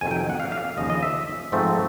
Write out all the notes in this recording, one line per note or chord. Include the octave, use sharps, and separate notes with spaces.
F2 C3 D#3 F#3 G#5
G5
G5
F#5
F5
F5
F5
D#2 C#3 F3 D#5
D#5
E5
G#2 F3 A3 C4